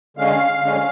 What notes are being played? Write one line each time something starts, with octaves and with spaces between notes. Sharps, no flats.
D3 G#3 C#4 F5
F2 D3 G#3 C#4